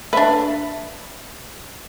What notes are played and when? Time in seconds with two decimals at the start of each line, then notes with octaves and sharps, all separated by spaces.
0.13 D4 B4 E5